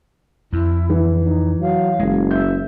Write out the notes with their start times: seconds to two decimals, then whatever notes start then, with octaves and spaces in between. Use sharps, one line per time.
0.53 F2 E4
0.90 E3
1.23 D#4
1.61 F#3 F5
2.00 F#1 G#3
2.31 E5 G6